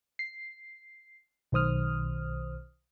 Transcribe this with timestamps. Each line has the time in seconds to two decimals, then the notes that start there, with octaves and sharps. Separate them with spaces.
0.19 C7
1.52 B1 D#3 C5 D#6 F6